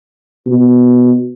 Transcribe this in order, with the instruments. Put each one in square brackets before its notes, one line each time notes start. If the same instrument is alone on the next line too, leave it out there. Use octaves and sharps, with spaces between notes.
[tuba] B2